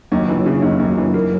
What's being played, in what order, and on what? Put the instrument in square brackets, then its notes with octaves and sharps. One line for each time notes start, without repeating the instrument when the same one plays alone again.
[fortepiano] D#2 [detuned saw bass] F#3
[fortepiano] E3
C#3
D#2
D#2
E3
A#3